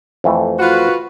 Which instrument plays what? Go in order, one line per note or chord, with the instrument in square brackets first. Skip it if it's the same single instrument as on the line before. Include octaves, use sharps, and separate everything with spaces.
[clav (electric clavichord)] F2 E3 A3
[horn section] F4 F#4 B4